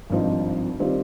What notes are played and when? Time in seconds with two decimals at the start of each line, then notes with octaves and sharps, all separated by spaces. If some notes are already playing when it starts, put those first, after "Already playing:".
0.10 G#1 G2 F3 C4 D#4
0.79 D#3 G3 C4 F4